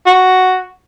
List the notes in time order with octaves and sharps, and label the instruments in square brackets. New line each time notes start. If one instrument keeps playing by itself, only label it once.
[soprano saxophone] F#4